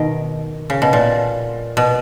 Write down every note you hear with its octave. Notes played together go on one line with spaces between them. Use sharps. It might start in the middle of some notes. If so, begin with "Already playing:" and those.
Already playing: B2 D#3
C#3
B2
A#2
B2